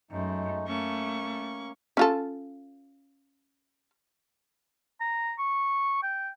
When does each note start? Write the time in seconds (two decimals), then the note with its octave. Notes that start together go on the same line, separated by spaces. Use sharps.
0.11 F#2 G#3 A3 D#4
0.67 A3 A#3 C#4 C#6
1.97 C#4 F4 A4
5.00 A#5
5.39 C#6
6.03 G5